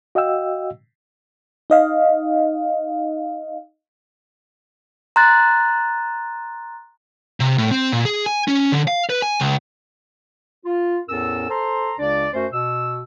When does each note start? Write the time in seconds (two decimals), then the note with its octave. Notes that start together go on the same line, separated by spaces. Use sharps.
0.15 F#4 D#5 F5 G5 E6
1.70 D#4 D#5 F5
5.16 A#5 C6 F#6 A6
7.40 C3
7.58 A2
7.71 C4
7.92 A#2
8.05 G#4
8.26 G#5
8.48 C#4
8.72 D3
8.88 F5
9.10 B4
9.22 G#5
9.40 C#2
10.65 F4
11.09 E2 A2 C#4 A4 A#4 E6
11.49 A4 C5 A#5 C6
11.99 C#2 C#3 D4 D5
12.34 F#2 A3 C#4 F#4 C5
12.53 B2 E6